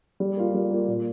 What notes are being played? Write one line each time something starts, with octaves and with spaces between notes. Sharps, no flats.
G3
A#3 F4
G3
A#3 F4
A#2